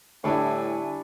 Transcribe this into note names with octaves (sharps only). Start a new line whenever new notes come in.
A2 D3 G3 D4 E4 G#5 C#6